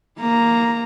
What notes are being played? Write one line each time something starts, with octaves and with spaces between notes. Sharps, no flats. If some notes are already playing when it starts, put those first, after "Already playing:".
A#3 A#5